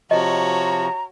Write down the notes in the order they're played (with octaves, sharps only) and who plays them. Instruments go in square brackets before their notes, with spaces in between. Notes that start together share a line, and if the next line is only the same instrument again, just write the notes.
[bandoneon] C3 F3 [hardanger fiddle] F#4 C#5 [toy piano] D#5 [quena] A#5